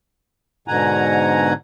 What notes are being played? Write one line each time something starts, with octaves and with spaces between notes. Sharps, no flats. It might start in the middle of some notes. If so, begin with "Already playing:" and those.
G#2 B2 D3 F#5 G#5 A#5